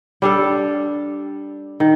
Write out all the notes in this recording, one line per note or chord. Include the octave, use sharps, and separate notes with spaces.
G3 D4 A4
D#3